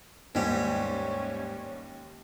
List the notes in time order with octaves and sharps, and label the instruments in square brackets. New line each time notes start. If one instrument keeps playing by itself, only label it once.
[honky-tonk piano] D#2 [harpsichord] G#2 G3 [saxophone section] C#4